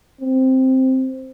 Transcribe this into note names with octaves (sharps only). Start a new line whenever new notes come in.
C4